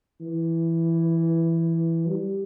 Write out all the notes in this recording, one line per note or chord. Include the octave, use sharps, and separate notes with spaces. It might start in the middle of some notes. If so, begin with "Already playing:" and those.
E3
G3